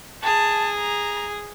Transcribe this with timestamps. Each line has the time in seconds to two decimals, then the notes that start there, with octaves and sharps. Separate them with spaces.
0.23 G#4 A5
0.79 A#5